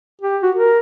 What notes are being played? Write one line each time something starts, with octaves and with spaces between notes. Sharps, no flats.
G4
F#4
A#4